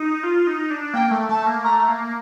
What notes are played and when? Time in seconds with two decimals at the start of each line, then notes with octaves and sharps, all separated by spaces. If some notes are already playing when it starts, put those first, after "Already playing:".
Already playing: D#4
0.23 F4
0.47 D#4
0.70 D4
0.94 A#3 G5
1.11 A3
1.29 A3 A5
1.47 A#3
1.64 A3 A#5
1.88 A#3